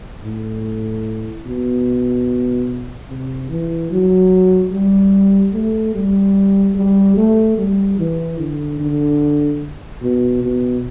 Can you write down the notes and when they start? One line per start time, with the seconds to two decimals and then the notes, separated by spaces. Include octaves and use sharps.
0.24 A2
1.46 B2
3.09 C3
3.50 E3
3.91 F#3
4.72 G3
5.54 A3
5.95 G3
6.76 G3
7.17 A3
7.58 G3
7.99 E3
8.39 D3
8.80 D3
10.02 B2
10.43 B2